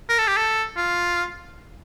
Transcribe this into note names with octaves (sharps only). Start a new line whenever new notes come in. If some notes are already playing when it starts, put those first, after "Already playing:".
A#4
A4
G4
A4
F4